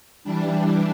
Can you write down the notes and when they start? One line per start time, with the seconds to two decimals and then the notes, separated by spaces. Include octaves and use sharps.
0.24 E3 G3 D4